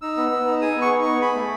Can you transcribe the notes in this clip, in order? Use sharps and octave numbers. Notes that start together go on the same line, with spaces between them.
D#4 E6
B3
B3
D#4
G#4 D#6
B3
C#6
D#4
B3 C#6
G#4 B5
A3